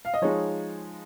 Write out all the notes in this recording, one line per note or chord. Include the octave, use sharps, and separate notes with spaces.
F5
D#5
F3 G#3 D#4 C#5